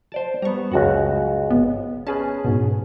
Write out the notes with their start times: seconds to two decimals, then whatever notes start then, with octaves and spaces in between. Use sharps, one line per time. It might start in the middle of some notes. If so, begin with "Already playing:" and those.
0.12 C5 D5 A5
0.42 G3 B3 A#5 C#6
0.72 C#2 F#2 F#4 F#5
1.50 G#1 B3
2.07 C#4 G#4 B4 A5
2.45 G#2 B2